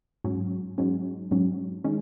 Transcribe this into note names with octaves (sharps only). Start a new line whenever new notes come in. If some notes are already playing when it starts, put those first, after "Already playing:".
G#2 F#3 C#4
G#2 F#3 C#4
G#2 F#3 C#4
D#3 G#3 C#4